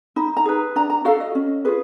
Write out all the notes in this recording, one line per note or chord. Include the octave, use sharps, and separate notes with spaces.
D#4 B5
A#5
G#4 B4
D4 A#5
A#5
F#4 A4 F5
D#5
C#4
F4 G#4 B4